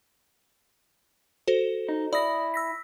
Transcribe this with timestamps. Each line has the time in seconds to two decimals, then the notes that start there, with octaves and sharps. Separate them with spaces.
1.48 F#4 A4 C5
1.89 D#4
2.13 E4 D5 D#6 A#6
2.54 E6 A#6 B6